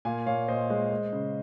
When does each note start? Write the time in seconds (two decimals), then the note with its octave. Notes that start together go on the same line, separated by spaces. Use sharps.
0.05 A#2 F5 G#5
0.26 A#2 C#5 F5
0.48 A#2 C5 D#5
0.70 G#3
0.91 G#3
1.13 C#3